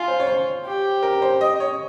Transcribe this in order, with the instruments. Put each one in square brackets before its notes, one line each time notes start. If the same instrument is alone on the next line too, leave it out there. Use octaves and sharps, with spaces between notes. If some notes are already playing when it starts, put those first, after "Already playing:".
Already playing: [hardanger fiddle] F4 [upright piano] G#5
[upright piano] C5
C#5
C5
[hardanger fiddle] G4
[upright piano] A#4
C5
D#5
C#5